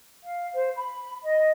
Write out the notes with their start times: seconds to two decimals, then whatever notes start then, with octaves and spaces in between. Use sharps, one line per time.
0.23 F5
0.54 C5
0.75 B5
1.22 D#5